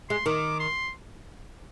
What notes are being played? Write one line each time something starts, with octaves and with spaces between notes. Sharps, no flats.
G#3 C6
D#3 D6
C6